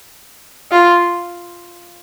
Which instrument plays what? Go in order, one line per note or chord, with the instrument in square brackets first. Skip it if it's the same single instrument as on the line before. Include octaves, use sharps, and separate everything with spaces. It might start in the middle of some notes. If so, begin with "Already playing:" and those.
[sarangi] F4